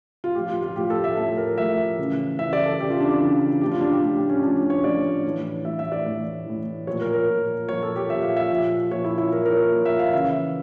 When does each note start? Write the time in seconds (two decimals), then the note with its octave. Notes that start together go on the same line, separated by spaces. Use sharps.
0.24 F4
0.35 A2 F3 G4
0.49 F4
0.62 F4
0.76 A2 F3 G4
0.90 A4
1.04 E5
1.17 A2 F3 A4
1.37 A#4
1.58 A2 F3 E5
1.98 C#3 E3
2.39 C#3 E3 E5
2.53 D5
2.66 A4
2.80 C#3 E3 G4
2.90 F4
3.00 D4
3.11 D4
3.21 C#3 E3
3.61 A2 F3 G4
3.72 F4
3.81 D4
3.92 G4
4.03 A2 F3
4.15 G4
4.29 C#4
4.43 A2 F3 D4
4.57 D4
4.70 C#5
4.83 A2 F3 D5
5.24 A2 E3
5.65 A2 E3 E5
5.79 E5
5.92 D5
6.06 A2 E3
6.46 A2 E3
6.87 A#2 F3 C#5
7.00 A#4
7.14 A#4
7.28 A#2 F3
7.69 A#2 F3 C#5
7.83 A4
7.96 G4
8.09 A#2 F3 E5
8.22 F5
8.37 E5
8.50 A#2 F3
8.91 A#2 F3 C#5
9.04 E4
9.18 E4
9.32 A#2 F3 A#4
9.45 A#4
9.52 C#5
9.72 A#2 F3
9.85 E5
9.99 F5
10.13 C#3 E3 E5